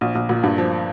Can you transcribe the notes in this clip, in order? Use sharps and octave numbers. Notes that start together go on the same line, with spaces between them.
A#1
A#1
A#2
G2
F3